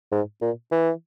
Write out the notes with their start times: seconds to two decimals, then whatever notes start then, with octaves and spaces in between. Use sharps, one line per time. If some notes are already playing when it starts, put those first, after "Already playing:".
0.12 G#2
0.42 A#2
0.72 E3